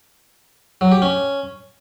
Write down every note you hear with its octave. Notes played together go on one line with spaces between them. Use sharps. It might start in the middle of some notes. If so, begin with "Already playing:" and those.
F#3
G4
C#4